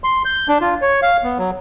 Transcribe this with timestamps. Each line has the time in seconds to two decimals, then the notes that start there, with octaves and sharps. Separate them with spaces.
0.04 C6
0.25 G6
0.48 D4
0.61 F4
0.82 C#5
1.03 F5
1.24 B3
1.38 F#3